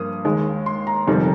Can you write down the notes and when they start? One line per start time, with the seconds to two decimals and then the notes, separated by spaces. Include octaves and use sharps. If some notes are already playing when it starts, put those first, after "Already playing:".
Already playing: G2 F3 A#3 D#6
0.25 D#2 D#3 G#3
0.66 C6
0.87 A#5
1.07 G1 F2 C3 D#3 G3